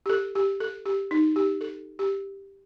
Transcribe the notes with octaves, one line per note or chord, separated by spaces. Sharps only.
G4
A4
G4
A4
G4
D#4
G4
A4
G4